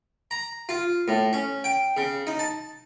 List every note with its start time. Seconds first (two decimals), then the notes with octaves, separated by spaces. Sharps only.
0.31 A#5
0.69 F4
1.08 A2
1.33 C#4
1.64 G5
1.97 C#3
2.27 D#4
2.39 A5